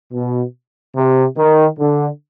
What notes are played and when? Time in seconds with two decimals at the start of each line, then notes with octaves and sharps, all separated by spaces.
0.13 B2
0.96 C3
1.38 D#3
1.79 D3